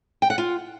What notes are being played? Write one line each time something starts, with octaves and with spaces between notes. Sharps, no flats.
G5
F#5
F4